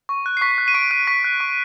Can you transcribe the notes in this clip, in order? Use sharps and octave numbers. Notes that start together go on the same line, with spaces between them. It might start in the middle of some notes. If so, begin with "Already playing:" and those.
C#6
F#6
C7
C#6 B6
F#6
D#7
C#6 D7
F#6 D#7
C#6 B6
F#6
C#6